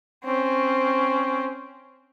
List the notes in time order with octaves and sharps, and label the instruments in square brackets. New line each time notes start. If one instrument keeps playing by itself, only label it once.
[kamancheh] C4 C#4